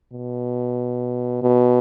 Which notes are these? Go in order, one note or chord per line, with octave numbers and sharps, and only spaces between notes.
B2
B2